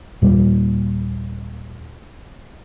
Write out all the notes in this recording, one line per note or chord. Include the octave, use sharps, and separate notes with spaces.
D#2 A#2 G3